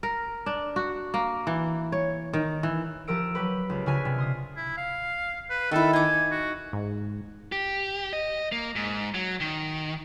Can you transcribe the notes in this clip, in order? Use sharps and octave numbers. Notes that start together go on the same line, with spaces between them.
A#4
D4
F#4
A#3
E3
C#5
D#3
E3
F3 G4 A#4 E6 D7
F#3 G4 B4
C#2 F4
C#3 D4 F4 G#5 F6 B6
C3
C6 D#6
E4
F5
B4
D#3 E4 A4
D#4 G#5 D6
F#4
G#2
G4
D#5
A#3
G#2
F#3
D#3